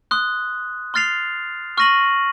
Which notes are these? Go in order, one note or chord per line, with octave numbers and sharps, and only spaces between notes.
C6 D#6 F#6
C6 F6 A6 C7 F7
C#6 F6 A#6 D#7 F#7